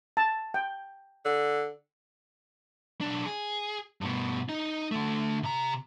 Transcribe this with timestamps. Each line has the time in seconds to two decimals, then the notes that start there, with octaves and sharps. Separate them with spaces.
0.17 A5
0.54 G5
1.25 D3
3.01 B1 D4
3.25 G#4
4.01 G2 B2
4.49 D#4
4.91 D3 A3
5.43 C3 A#5